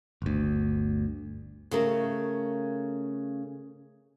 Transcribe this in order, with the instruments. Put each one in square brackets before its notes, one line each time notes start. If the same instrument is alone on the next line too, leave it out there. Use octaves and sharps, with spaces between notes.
[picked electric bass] G1 D2
[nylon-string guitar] C#3 A3 A#4